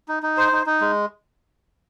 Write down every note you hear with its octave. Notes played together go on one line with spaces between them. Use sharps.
D#4
D#4
C5
D#4
D#4
G#3